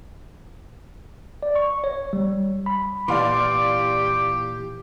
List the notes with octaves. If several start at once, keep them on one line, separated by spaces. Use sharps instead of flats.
D5
C#6
C#5
G3
B5
A#2 E3 G4 D5 F5 C6 D6